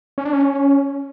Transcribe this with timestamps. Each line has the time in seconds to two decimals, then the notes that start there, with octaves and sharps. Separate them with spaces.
0.18 C#4
0.25 D4
0.33 C#4